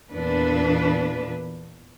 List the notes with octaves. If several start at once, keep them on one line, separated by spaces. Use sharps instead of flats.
E2 A#2 D4 B4